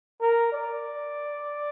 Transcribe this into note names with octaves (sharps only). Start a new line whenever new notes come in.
A#4
D5